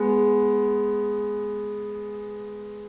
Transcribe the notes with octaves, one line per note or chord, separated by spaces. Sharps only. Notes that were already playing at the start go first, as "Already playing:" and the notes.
Already playing: G#3 B3